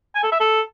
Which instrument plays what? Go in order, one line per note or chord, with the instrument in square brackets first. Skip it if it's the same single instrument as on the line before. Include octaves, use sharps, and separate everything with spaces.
[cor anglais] G#5
A4
E5
A4